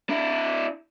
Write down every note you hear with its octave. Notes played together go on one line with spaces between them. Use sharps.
D4 E4